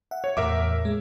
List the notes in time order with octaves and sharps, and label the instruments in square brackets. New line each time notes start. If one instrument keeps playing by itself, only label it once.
[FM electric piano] E5 F#5
[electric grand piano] C#5
[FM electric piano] E2 A2 [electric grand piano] A#4 E5 D6
[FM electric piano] G#3